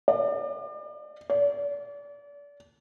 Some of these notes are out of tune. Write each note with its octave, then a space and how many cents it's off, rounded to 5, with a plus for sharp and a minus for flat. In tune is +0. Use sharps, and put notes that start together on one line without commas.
D5 +35
D5 -35